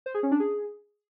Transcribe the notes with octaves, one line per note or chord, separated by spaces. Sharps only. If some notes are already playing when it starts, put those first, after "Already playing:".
C5
G#4
C#4
D4
G#4